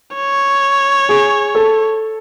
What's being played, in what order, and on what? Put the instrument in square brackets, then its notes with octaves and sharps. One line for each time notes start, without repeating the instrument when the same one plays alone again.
[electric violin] C#5
[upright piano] G#4
A4